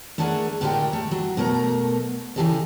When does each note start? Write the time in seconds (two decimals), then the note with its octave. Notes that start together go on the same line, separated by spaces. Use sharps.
0.18 A3 D4 E4 G#4 A#4 F#5
0.61 A2 D3 G#3 G4 A#4 G5
0.93 A3
1.11 F#3
1.37 B2 F#3 A3 A#4
2.36 C#3 E3 F#3 G4 A4 D#5